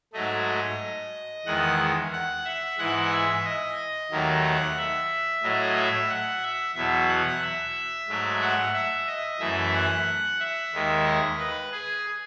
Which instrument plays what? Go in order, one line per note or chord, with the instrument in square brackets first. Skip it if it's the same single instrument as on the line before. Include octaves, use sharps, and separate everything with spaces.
[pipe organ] G#2 F#3 A3 D#5
E2 D#3 G#3 F#5
F#5
E5
G#2 E3 G#3 F#5
E5
D#5
D#2 D#3 F#3 A3
F#5
E5
A2 F#3 A3 D#5
E5
F#5
E5
E2 B2 F#3 E5
F#5
E5
G#2 F#3 A3
F#5
E5
D#5
F#2 E3 A3 E5
F#5
E5
D#2 D#3 G#3
D#5
B4
G#4